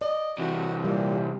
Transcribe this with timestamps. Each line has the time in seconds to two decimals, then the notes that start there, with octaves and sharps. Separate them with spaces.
0.01 D5 D#5
0.39 C3 E3 F#4
0.84 A#2 G3 G4